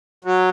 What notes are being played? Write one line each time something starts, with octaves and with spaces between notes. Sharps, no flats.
F#3